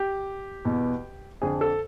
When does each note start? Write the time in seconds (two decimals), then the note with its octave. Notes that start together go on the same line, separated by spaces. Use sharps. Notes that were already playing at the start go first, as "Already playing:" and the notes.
Already playing: G4
0.65 E2 B2
1.42 F2 D3 G#4
1.61 A4